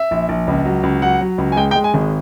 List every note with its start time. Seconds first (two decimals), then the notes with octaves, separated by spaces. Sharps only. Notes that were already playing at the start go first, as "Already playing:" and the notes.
Already playing: E5
0.11 A#1
0.29 A#1
0.48 C#2
0.65 F#3
0.83 C#2
1.02 F#3 F#5
1.21 F#3
1.38 C#2
1.52 G#5
1.56 G#3 G5
1.71 G5
1.76 G#3
1.84 G#5
1.94 G#1